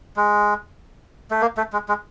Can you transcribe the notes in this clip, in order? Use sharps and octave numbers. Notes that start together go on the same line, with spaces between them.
G#3
A3
A#3
A3
G#3
G#3